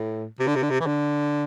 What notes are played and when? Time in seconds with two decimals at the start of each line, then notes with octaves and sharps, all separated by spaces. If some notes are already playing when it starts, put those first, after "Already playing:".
Already playing: A2
0.40 C3
0.47 D3
0.56 C3
0.62 D3
0.70 C3
0.80 E3
0.86 D3